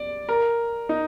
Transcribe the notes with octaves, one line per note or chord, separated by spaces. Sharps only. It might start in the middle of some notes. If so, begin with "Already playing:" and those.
Already playing: D5
A#4
D#4